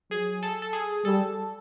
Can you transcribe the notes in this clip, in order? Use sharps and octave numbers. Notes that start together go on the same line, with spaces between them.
F#3 G#4
A4
A4
G#4
G3 A4